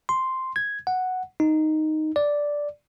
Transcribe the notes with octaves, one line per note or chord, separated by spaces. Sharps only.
C6
G#6
F#5
D#4
D5